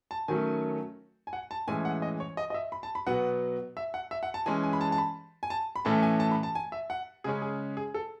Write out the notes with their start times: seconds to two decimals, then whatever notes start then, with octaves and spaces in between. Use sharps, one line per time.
0.11 A5
0.28 D#3 F#3 A3 C#4 G#5
1.27 G#5
1.33 F#5
1.51 A5
1.68 A2 E3 G#3 C#4 G#5
1.85 F#5
2.02 D#5
2.20 C#5
2.37 D#5
2.50 D#5
2.54 E5
2.72 B5
2.83 A5
2.95 B5
3.07 B2 F#3 B3 F#5
3.77 E5
3.94 F#5
4.11 E5
4.23 F#5
4.34 A5
4.46 E3 G#3 C#4 G#5
4.63 G#5
4.73 B5
4.81 A5
4.92 A5
4.98 B5
5.43 G#5
5.50 A5
5.76 B5
5.85 A2 E3 A3 C#4 A5
6.03 G#5
6.20 A5
6.31 B5
6.43 A5
6.55 G#5
6.72 E5
6.90 F#5
7.24 C#3 G#3 C#4 G#4
7.42 G#4
7.77 G#4
7.94 A4